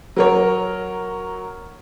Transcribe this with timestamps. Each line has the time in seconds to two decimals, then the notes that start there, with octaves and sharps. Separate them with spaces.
0.16 F#3 A#4 C#5